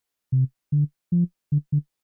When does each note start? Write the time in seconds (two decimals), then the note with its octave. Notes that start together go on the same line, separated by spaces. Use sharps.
0.32 C3
0.72 D3
1.12 F3
1.52 D3
1.72 D3